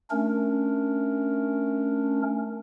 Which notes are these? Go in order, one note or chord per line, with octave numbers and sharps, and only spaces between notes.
A3 C#4 D4 A#4